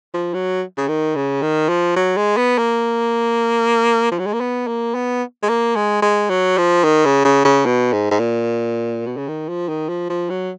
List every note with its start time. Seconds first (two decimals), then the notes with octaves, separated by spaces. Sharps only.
0.14 F3
0.34 F#3
0.78 C#3
0.88 D#3
1.16 C#3
1.42 D#3
1.69 F3
1.96 F#3
2.17 G#3
2.37 B3
2.58 A#3
4.11 F3
4.19 F#3
4.26 G#3
4.34 A#3
4.40 B3
4.67 A#3
4.95 B3
5.43 G#3
5.49 A#3
5.76 G#3
6.02 G#3
6.30 F#3
6.58 F3
6.84 D#3
7.05 C#3
7.25 C#3
7.45 C#3
7.66 B2
7.93 G#2
8.11 G#2
8.20 A#2
9.07 B2
9.17 C#3
9.28 D#3
9.49 F3
9.69 D#3
9.89 F3
10.10 F3
10.30 F#3